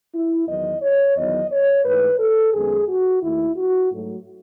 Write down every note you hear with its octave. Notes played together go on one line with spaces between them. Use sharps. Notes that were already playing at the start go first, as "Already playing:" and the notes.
E4
E2 D#3 F#3 B3 D#5
C#5
E2 D#3 F#3 B3 D#5
C#5
G#2 E3 A3 B4
A4
F#2 D#3 G#3 B3 G#4
F#4
D#2 D#3 A3 E4
F#4
G#2 F#3 A3